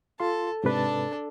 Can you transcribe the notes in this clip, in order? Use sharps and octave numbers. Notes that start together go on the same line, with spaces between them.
F4 A4 C6
G#2 C3 D4 A4 B4